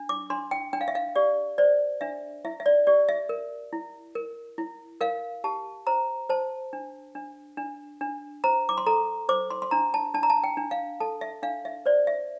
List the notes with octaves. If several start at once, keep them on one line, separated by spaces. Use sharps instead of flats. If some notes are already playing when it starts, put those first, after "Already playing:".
Already playing: D4
D6
D4 C6
G5
D4 G5
F5
E5
F5
G4 D5
C5 D5
D4 E5
E4 E5
E5
D5
G4 D5
E5
A#4
E4
A#4
E4
A#4 F5
G4 A5
C5 A#5
C5 A5
D4
D4
D4
D4
C5 A#5
D6
C6
A4 A#5
C5 D6
C6
C6
D4 A#5
A5
D4 A5
A#5
A5
G5
D4
F5
A4 A5
E5
D4 F5
E5
C5 D5
E5